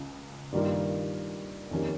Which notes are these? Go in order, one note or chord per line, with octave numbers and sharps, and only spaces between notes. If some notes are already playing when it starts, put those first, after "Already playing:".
Already playing: C#2 C#3
G2 D#3 G3 A#3 F4
F2 D#3 A#3 C#4 G4